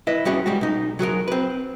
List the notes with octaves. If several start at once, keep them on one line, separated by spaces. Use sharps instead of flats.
E4 B4 D#5
G3 B3 C#4 E4 F#4 G#4
G3 G#3 F#4
B1 D#4
F#3 F#4 G#4 A#4
C4 B4